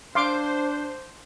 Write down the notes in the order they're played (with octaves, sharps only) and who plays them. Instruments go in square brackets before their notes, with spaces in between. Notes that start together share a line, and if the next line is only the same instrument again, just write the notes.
[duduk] D4 [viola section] C5 [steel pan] F5 C6 D6